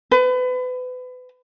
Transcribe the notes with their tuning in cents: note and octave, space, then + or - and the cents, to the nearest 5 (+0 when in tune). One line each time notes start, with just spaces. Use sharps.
B4 +30